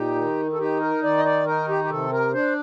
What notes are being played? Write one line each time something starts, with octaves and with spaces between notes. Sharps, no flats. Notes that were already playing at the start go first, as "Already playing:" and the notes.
Already playing: A#2 D#4 G4
D#3
A4
D#4 G4
A#4
D#3 D5
D#5
D5
D#4 A#4
G4
G4
C3 A4
A#4
D4 C5